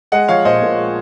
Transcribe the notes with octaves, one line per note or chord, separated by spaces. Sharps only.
G#3 D#5 F#5
F3 C#5 F5
A#1 C5 D#5
A#2
G#3